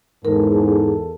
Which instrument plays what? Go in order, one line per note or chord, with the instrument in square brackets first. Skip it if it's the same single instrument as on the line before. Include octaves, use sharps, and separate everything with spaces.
[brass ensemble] E2 A4 [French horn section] G#2 [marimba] A#4